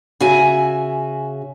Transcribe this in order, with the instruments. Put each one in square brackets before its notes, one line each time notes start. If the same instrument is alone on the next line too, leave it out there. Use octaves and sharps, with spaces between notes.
[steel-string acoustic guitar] C#3 F#4 E5 G#5